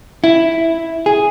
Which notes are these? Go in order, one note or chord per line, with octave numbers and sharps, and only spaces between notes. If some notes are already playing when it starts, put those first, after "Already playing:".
E4
G#4